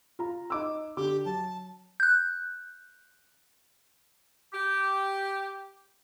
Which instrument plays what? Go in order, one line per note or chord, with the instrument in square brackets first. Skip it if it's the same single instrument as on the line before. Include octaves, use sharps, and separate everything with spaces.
[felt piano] F4 A#5
D#4 D6 E6
[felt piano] D3 D6 [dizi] G4
[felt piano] F#3 [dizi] A5
[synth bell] F#6 G6
[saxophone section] G4